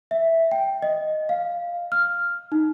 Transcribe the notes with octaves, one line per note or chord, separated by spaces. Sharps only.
E5
G5
D#5
F5
F6
D#4